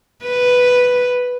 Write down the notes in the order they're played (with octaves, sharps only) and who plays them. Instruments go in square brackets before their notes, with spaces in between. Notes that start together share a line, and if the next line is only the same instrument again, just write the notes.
[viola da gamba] B4